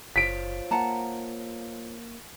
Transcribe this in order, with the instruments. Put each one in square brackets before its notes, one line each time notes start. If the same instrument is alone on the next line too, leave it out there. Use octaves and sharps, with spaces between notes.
[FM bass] F#1 [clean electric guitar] F4 C5 C#5 [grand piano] B6 D7
[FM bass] A#3 [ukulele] F#5 A5 A#5